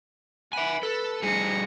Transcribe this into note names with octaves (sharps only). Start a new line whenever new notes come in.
E5 F#5 G#5 B5
A4 B4
G2 G#4 A#6 C#7